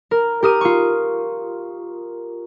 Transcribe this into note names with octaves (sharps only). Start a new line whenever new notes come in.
A#4
G4 A#4 D#6 D#7
F4 C#6